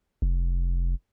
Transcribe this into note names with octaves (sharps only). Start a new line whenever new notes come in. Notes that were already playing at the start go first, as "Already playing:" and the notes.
F1